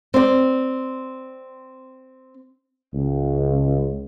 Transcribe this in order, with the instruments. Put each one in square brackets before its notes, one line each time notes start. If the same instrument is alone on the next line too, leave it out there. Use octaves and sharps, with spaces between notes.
[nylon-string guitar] C4 D5
[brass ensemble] C#2